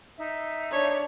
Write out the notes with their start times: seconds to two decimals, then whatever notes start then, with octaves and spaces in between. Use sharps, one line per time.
0.18 D#4 E5
0.72 D4 C#5